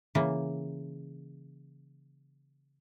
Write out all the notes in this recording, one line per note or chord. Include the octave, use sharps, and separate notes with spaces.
C#3 E3 A#3